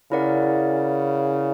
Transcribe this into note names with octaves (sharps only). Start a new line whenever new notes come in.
C#3 E4 A#4 D5 F#5